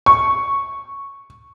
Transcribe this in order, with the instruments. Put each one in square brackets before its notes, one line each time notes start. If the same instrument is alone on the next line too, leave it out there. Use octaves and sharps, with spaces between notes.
[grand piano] C#6